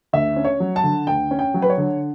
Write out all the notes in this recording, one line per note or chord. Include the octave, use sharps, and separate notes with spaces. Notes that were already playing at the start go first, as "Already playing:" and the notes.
D2 E5
C#4
C#5
F#3
A5
D3
D2 G5
C#4
G5
F#3
B4
C#5
D3